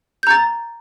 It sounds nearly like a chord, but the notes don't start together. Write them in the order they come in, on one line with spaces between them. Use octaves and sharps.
G6 A#5 A6